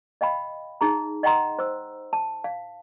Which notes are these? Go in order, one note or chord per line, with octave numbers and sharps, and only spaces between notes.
D#5 F5 G5 B5
D#4 G#4 A#5
D#5 F#5 G5 A#5 C6
C5 E6
A5
F5